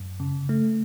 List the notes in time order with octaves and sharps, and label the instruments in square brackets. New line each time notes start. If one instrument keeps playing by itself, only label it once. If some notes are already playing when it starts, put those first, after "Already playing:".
Already playing: [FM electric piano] F#2
C#3
A3